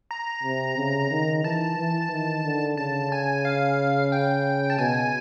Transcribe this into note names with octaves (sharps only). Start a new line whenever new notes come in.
A#5
C3
C#3
D#3
E3 A5
E3
D#3
D3
C#3 A5
G#5
F5
G5
A5
B2 G#5